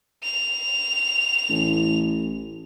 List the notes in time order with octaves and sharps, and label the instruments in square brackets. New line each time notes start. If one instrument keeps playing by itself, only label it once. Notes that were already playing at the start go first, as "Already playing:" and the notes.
[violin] F7
[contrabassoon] A1